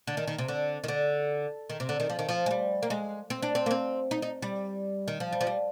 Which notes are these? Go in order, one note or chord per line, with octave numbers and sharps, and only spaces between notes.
D3
D#3
D#3
C3
D3
D#3
D3
D#3
C3
D3
D#3
F3
D#3
F3
G#3
G3
A#3
G#3
C4
D4
C4
A#3
C4
D#4
D#4
G3
D#3
F3
G3
F3
G3